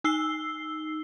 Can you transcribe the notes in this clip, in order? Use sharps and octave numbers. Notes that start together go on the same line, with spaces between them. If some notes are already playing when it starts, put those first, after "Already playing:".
D#4 E6 C7 G7